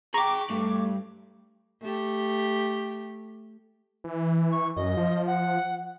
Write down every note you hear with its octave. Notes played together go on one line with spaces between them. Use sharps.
G#4 G5 A#5 C#6 D6
G2 A3
A3 G4
E3
C#6
F#2 D#5
F3
F#5